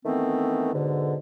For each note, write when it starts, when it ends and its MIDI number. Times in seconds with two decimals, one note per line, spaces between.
0.05 0.71 51
0.05 0.71 52
0.05 0.71 57
0.05 0.71 59
0.05 0.71 60
0.74 1.15 44
0.74 1.15 47
0.74 1.15 50